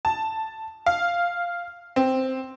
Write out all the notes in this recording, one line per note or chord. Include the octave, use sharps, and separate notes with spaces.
A5
F5
C4